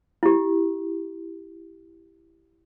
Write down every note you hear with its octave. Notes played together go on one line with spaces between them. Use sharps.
E4 G4